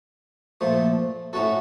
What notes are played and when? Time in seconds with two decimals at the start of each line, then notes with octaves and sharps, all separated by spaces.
0.61 A#2 F3 A3
1.33 A2 A3 C#4 F#4 A4